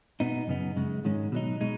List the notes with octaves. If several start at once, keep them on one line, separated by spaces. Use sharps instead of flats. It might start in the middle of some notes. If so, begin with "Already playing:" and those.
B2 B3 D#4
F#2 C#3 B3 D#4
F#2 C#3 G#3
G#2 D#3 G#3 C#4
B2 F#3 D#4
B2 G#3 D#4